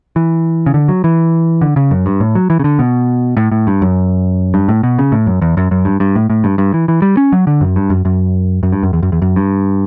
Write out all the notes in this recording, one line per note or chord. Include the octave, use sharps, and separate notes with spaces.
E3
C#3
D3
F#3
E3
D3
C#3
F#2
G2
A2
F#3
E3
C#3
D3
B2
A2
A2
G2
F#2
G2
A2
B2
C#3
A2
F#2
E2
F#2
F#2
G2
G2
A2
A2
G2
G2
E3
E3
G3
C#4
F#3
D3
F#2
G2
F#2
F#2
F#2
G2
F#2
E2
F#2
E2
F#2
G2